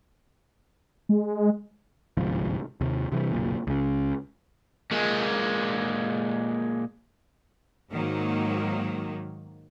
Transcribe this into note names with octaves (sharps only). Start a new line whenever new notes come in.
G#3
G1 C2 G#2 F3
D#2 C3
C3 E3 G3
F#1 B1 A#2
C#2 C#3
A#2 G#3
G#2 D#3 F#3 A#3